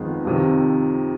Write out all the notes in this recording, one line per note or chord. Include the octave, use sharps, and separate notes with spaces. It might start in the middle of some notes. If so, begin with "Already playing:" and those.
Already playing: F2 D#3 G#3 B3
F2 C3 D#3